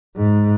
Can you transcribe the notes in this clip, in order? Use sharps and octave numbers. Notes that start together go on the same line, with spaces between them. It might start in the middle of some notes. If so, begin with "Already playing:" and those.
G#2